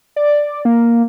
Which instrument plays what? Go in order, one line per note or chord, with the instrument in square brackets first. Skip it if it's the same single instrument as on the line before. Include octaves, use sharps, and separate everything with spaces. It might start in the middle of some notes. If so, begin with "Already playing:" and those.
[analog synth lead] D5
A#3